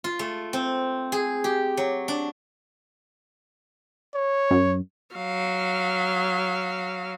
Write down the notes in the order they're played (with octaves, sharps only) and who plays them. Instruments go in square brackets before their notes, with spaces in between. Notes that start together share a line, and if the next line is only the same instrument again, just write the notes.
[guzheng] F4
A3
C4
G#4
G4
F#3
D4
[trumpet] C#5
[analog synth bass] F#2
[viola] F#3 F5